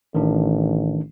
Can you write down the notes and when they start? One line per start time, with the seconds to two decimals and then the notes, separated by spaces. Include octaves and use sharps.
0.15 A1 D#3 D4